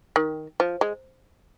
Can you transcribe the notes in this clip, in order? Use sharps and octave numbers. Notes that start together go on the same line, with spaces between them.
D#3
F3
G#3